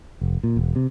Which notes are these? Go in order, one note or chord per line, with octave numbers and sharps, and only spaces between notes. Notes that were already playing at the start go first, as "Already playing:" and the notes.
F1
A#2
E1
C3